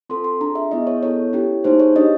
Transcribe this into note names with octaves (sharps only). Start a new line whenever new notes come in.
C4 F4 A4 C6
C6
D4 F4 G#4 A#5
E5
B3 E4 G#4 D#5
C#5
B3 E4 A4 C#5
C#4 E4 G4
A#3 D#4 G#4 C5
C#5
D4 G4 D#5